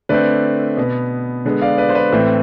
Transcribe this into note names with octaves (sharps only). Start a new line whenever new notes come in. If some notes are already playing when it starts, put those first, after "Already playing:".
D3 A3 C4 B4 D5
B2 B3
D3 G#3 B3
D5 F5
B4 D5
C5
B4
A2 E3 A3 C4